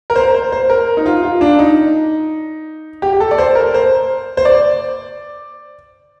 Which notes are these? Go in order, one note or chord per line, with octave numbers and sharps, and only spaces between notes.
A#4
C5
C5
C5
A#4
D#4
F4
F4
D4
D#4
G4
G4
A4
D5
C5
A#4
C5
C5
D5